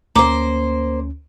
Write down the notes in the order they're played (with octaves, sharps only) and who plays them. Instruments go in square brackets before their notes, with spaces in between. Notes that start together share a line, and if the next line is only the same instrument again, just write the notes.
[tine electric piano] D2 C#4 [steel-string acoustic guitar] A#3 C5 [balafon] A#5 D6